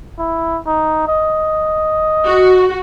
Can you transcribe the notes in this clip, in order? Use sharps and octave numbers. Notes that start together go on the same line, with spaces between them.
E4
D#4
D#5
F#4